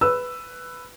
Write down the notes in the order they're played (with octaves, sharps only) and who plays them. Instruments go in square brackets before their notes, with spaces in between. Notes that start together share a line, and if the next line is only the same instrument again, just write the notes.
[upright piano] B4 E6